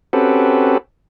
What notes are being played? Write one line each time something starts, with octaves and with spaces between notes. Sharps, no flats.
C4 C#4 F#4 G4 A4 B4